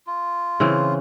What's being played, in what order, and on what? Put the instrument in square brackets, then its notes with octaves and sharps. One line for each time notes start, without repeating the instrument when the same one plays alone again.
[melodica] F4
[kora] C#3 E3 C4